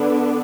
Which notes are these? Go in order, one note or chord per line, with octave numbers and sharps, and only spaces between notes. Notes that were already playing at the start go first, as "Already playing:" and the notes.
Already playing: D3 B3 D4